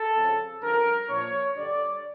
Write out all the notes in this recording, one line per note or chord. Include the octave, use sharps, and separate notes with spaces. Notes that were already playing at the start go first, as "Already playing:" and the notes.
Already playing: A4
F2 C#3 F3
G2 D3 F3 C#4 A#4
A#2 F3 A#3 D4 C#5
G2 D3 G3 D4 D5